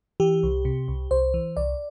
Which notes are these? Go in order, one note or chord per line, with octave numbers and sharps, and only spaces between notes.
E3 G4
C2
C3
C2
C2 C5
E3
C2 D5